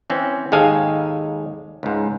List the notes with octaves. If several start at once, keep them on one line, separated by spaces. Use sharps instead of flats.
E3 C4 C#4
D#2 G#2 G#3 A4 F5 G#5
C#2 G#2